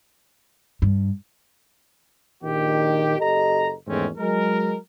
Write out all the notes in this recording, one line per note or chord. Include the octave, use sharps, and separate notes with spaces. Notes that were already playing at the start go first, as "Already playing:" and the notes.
G2
A#1 D#3 G4
F#1 G4 A4 D#5 A#5
E2 G#2 D#3 A3 C4 C#4
F#3 G#3 A#4